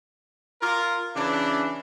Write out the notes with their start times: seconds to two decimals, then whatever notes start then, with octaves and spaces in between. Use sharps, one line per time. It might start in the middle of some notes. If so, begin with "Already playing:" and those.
0.62 F4 A#4
1.16 C#3 E3 D4